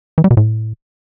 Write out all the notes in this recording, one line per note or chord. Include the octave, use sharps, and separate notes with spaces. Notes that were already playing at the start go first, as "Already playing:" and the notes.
E3
G3
B2
A2